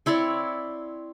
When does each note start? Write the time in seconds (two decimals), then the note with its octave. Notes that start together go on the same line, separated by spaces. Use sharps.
0.06 C4 E4 C#5 D5